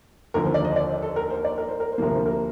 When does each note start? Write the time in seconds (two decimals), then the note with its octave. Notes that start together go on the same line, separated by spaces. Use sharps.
0.34 D#2 D3 F3 A#4
0.45 C5
0.54 D5
0.65 D#5
0.76 D5
0.88 C5
1.02 A4
1.16 A#4
1.30 C5
1.44 D5
1.58 A#4
1.68 C5
1.80 A#4
1.92 C5
1.98 D2 C3 F3 A#3 A#4
2.15 C5
2.26 A#4